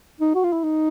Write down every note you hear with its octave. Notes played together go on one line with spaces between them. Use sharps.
D#4
F#4
F4
E4
D#4